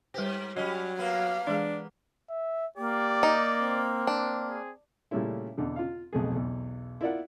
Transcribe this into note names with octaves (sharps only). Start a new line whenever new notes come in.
G#2 G3 G4 B4 C5
F#3 G3 C#4 D#5
A#3 B3 F5
E3 G#3 D4 G#4
E5
A#3 G4 D5
D#4
C4
D4
G#4
A#2 C#3 G3 A3 C#4 E4
E2 B2 D3
F4 F5
B1 F2 A3 G#4
B1 E2
E4 F4 A#4 D5 E5 F#5